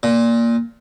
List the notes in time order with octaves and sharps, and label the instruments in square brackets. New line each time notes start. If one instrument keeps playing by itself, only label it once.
[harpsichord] A#2